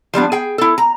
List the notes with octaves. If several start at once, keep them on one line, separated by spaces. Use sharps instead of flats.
F3 G3 B3 D4
G#4 G5
E4 A4
A#5